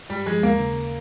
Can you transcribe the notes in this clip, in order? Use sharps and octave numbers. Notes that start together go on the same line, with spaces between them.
G2 G3
F3 G#3
D#2 A#3
C#3